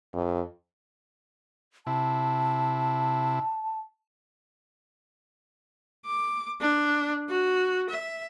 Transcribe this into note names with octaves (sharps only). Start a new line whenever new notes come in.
F2
C3 E4 A5
D6
D4
F#4
E5